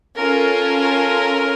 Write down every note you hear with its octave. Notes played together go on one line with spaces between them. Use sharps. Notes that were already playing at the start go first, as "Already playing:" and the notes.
C#4 F4 A4 A#4